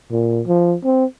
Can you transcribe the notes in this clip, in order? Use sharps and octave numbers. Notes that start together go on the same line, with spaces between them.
A#2
F3
C4